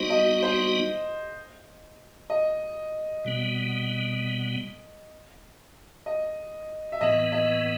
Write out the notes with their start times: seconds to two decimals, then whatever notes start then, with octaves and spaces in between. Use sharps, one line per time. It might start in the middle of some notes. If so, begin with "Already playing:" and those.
Already playing: G3 B3 D#4 F#4 C5 D#5
0.10 D#5
0.42 C5
2.30 D#5
3.25 B2 G3 B3
6.06 D#5
6.92 E5
7.01 A2 E3 B3 D#5
7.32 D#5